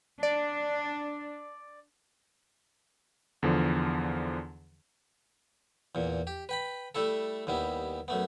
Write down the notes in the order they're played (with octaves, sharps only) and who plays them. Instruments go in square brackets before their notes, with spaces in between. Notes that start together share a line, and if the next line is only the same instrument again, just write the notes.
[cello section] D4 [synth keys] D5
[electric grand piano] E2 D3 F3
[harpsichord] E2 A#2
G4
B4 G5 B5
G3 A3 E4 A4
D#2 G3 B3 E4
F#2 A3 B3